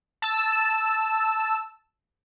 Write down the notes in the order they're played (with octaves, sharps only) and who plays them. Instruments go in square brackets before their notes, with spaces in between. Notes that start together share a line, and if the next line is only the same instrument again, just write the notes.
[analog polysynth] A5 E6